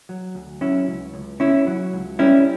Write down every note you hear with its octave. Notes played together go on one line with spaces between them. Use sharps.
F#3
D2
F#3 C#4 E4
C#2
C#2
C#3 C#4 E4
F#3
C#2
G3 C#4 E4